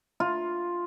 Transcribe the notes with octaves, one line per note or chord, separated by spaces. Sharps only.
F4